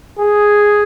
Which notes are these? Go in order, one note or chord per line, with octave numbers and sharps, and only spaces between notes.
G#4